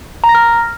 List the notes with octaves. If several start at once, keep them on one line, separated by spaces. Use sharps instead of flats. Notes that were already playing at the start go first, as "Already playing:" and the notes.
A#5
A#6
F6